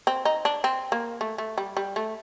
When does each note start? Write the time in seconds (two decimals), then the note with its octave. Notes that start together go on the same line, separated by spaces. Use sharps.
0.07 C4
0.25 D#4
0.45 D4
0.64 C4
0.92 A#3
1.21 A3
1.38 A3
1.58 G3
1.77 G3
1.96 A3